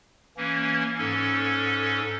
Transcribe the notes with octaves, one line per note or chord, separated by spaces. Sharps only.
E3 A#3 C#4
G#2 C#4 A4